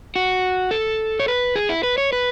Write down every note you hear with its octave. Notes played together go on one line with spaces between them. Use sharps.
F#4
A4
C#5
B4
G#4
E4
B4
C#5
B4